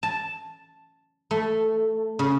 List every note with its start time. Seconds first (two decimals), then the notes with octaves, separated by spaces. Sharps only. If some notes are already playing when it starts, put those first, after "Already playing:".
0.03 A5
1.31 A3
2.19 C#3